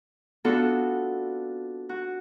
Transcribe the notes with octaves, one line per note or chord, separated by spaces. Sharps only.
B3 C4 D4 F4 F#4 A4
F#4